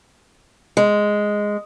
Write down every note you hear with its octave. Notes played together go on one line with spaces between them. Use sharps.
G#3